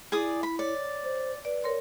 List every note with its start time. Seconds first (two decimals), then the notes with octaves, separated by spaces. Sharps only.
0.12 E4 G#4 D5 D#6
0.43 B5
0.59 C#5 D5
1.04 C5
1.45 B4 D5
1.64 A#4 C#5 C6